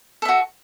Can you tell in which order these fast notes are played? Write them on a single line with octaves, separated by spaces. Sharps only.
A4 E5 F#4